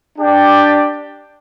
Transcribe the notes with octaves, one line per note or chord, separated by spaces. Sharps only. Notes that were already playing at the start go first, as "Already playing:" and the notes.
D4 G4 D5 G5